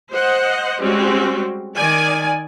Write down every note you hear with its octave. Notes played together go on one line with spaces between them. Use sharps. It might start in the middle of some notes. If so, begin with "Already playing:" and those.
C5 D#5 F#5
G3 G#3 C4 C#4 F#4
D#3 D5 G#5